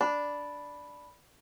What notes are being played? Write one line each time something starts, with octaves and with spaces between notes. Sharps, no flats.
D4 B5